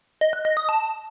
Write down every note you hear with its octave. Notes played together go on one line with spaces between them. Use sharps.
D#5
F#6
D#5
D#6
A5